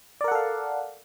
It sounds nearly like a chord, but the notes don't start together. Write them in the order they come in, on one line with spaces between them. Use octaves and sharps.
D5 A#4 F#5 A4 F5